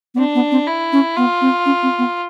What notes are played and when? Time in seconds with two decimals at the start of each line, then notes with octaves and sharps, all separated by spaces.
0.14 B3
0.18 C4 D4
0.35 B3
0.51 C4
0.68 E4
0.92 C#4
1.17 B3 F4
1.41 C4
1.65 C#4
1.83 C4
1.98 B3